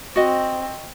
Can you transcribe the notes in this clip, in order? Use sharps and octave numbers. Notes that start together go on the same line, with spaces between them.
C4 F#4 D#5